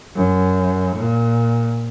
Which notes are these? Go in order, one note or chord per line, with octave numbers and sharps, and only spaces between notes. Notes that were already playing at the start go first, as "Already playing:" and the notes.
F#2
A#2